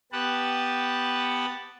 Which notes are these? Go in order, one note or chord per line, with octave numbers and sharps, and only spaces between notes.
B3 G4 B4 F#5 A5